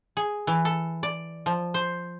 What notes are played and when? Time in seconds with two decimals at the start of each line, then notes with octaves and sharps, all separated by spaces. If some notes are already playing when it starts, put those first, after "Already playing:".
0.17 G#4
0.47 E3
0.65 A4
1.03 D5
1.46 F3
1.74 C5